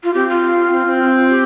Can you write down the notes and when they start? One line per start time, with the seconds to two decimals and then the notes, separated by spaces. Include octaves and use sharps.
0.04 F4
0.14 C4 G4
0.29 F4
0.72 C4
0.86 C4
1.02 F4
1.30 G4